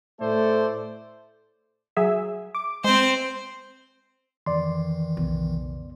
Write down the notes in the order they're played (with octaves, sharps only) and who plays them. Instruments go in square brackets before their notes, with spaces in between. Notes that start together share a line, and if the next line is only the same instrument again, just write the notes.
[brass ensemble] A2 A3 A4 C5 D5
[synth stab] F#3 G#4 E5
D6
[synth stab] G#3 [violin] C4 C5
[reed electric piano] F2 D5 C6 [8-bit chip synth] D#3 E3
[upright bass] B1 C#3